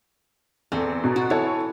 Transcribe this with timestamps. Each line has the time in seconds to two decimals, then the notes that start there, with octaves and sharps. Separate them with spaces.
0.72 E2 C4 A4
1.04 B2 A#5
1.16 F#4
1.30 E3 A4 C#5 A5